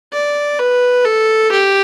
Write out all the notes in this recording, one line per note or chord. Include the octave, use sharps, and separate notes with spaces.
D5
B4
A4
G4